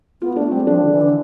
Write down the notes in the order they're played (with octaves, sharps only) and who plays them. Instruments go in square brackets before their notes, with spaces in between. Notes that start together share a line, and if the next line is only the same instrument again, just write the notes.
[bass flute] B3 [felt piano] F4
[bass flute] A3 [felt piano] D4
[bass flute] G3 [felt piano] C4
[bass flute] F3 [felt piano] D4
[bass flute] D3
E3
D3